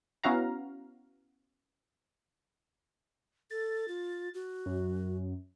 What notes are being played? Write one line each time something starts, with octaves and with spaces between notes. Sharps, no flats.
B3 C#4 E4 F#4 F5 A#5
A4 A6
F4
F#4
F#2